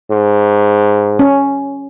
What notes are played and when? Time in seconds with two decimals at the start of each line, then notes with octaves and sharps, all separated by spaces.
0.11 G#2
1.19 C#4